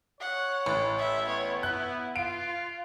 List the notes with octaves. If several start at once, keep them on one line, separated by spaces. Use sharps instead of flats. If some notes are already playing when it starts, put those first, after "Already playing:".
C#5 F#5
A1
E5
B3 C#5
E4 F#6
F4 F5 D7